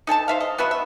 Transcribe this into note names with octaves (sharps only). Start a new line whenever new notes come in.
D#4 A4 G#5 A5
C5 E5 F5
D#5
B3 F#4 B4 E5
E5